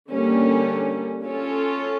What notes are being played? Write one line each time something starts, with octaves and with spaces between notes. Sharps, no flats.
D3 G3 A#3 C#4
C#4 F4 A4 C#5